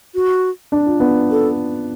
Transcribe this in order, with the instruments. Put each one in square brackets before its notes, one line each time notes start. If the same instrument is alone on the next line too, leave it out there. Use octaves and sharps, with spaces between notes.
[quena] F#4
[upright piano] D4
F4
B3 D4
[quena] A4